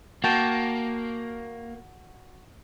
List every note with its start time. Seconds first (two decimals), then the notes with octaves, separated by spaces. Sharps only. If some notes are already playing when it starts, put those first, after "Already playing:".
0.24 A#3 F#4 G5 A5